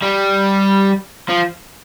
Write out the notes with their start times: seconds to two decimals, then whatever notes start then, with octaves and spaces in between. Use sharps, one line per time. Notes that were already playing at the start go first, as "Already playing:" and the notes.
0.03 G3
1.29 F3